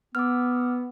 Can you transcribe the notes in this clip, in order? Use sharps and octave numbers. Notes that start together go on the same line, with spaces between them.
B3 D6 E6 F6